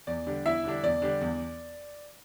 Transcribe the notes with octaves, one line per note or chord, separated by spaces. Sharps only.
E2 D5
D3 G3 D4
E2 E4 E5
D3 G3 D4
E2 D5
D3 G3 D4
E2